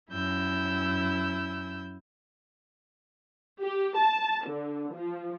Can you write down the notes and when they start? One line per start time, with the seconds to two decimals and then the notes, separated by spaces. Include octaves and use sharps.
0.12 F#2 E4 E6 G6
3.62 G4
3.98 A5
4.47 D3
4.95 F3